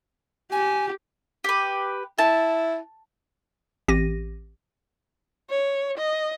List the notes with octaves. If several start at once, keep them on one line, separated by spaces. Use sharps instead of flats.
G4 G#5
G4 B4
E4 A5
A1 C4 G4 A#6 D#7
C#5
D#5